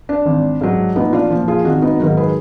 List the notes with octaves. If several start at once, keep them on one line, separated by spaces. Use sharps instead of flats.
D4
G#1
G#2 F#3
A#1 B3 D#4
D4 F4
A#2 F3
F4 G#4
G#1 D#4 F#4
B3 D#4
G#2 D#3 F#3 F#4 A#4
G#4 B4